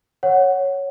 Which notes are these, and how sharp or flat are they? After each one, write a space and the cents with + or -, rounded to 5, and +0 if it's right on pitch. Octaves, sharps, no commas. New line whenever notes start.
C#5 +0 F#5 +0